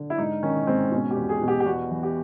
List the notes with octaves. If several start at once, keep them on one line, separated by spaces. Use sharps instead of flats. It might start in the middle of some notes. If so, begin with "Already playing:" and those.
Already playing: D3
E4
G#2 D#4
D#3 C#4
G#2 C4
B2 C#4
G4
E2
G#4
B2
G4
G4
E2 F#4
E3
G4